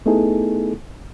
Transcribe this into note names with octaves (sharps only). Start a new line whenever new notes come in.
A3 B3 D#4 E4 G#4 A4